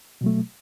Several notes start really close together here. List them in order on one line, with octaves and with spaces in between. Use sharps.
B2 F#3 A3